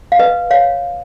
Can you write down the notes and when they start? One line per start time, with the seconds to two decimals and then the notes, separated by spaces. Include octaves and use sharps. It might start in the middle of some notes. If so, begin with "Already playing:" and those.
0.12 F5
0.19 B4 D#5
0.51 C#5 F5